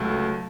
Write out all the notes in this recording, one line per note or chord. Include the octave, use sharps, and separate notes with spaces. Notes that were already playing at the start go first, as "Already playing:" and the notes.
Already playing: C#2 F#3 A3 A5